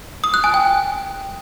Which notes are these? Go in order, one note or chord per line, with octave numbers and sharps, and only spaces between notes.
D#6
F#6
G#5
G5